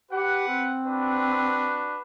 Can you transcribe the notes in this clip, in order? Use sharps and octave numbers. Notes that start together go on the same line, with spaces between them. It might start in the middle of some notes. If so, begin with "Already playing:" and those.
G4 B4 F#5
C4
D4 F#4 B4